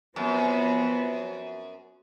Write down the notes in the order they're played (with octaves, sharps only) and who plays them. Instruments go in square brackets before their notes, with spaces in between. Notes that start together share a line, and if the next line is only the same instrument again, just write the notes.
[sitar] F#2 [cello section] F3 B3 C4